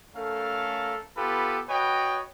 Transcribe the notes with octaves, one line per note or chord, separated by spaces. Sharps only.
A3 C#4 A4 A#4 F5
B3 F4 G4 A4 B4
F#4 B4 C#5 D#5 G5